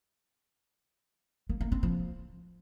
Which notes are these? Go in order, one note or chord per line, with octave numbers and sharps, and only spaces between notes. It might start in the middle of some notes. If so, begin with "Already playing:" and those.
A#3
A#3
C4
F3